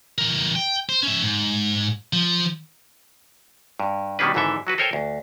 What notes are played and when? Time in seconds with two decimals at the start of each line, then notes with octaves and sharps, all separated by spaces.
0.18 E3 A#4
0.56 G5
0.89 C5
1.03 C#4 E5
1.22 G#2
2.13 F3
3.80 G2
4.19 B2 D#3 G3 C#4 D4 B4
4.34 G#1 G#2 D3 E3 A4 E5
4.67 F#3 F#4 B4
4.78 A4 A#4 C5 C#5 G5 G#5
4.93 D2